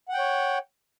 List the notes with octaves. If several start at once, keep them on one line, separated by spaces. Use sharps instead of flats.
C#5 F#5 G5